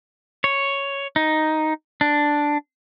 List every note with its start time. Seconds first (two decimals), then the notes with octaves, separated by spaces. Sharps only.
0.44 C#5
1.16 D#4
2.01 D4